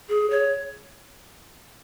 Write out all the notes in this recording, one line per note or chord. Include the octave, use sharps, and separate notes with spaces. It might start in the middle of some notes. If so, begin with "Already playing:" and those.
G#4
C#5